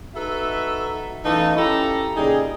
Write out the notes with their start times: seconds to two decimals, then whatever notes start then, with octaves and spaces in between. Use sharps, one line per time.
0.15 D#4 F#4 A4 B4 E5 A#5
1.25 F#2 E3 A3 D#4 F5 A5
1.57 C#4 E4 G4 A4 A#5 B5
2.16 A#2 C#3 G3 D#4 G#4